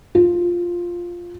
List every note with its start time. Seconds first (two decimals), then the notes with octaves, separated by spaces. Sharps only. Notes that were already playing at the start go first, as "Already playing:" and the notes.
0.15 F4